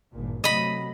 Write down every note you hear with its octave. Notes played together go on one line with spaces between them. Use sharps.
G#1 G2 A#2
C3 F#3 A3 D#5 B5